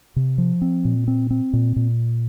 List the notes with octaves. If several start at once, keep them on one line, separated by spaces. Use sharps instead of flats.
C3
F3
C4
A#2
C4
C4
A#2
A#2